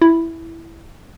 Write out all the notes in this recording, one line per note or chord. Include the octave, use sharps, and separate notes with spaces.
E4